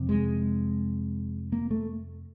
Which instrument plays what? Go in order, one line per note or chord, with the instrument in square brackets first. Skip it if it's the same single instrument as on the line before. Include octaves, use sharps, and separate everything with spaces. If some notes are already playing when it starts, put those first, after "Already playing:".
Already playing: [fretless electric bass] F2 C3
G#3
A#3
A3